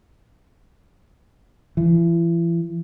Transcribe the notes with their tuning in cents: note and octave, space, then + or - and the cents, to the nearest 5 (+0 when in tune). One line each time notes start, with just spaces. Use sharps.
E3 +35